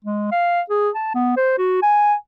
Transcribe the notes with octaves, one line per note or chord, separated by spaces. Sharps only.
G#3
F5
G#4
A5
B3
C5
F#4
G#5